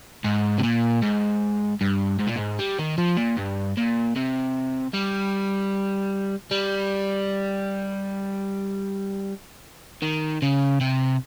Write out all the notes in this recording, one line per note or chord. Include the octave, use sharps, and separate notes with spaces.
G#2
C3
A#2
G#2
G2
G#2
A#2
G#2
G3
D#3
F3
A#2
G2
A#2
C3
G3
G3
D#3
C#3
C3